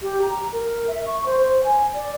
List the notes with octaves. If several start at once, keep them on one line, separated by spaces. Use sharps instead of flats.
G4
A#5
A#4
E5
C#6
C5
C5
G#5
D5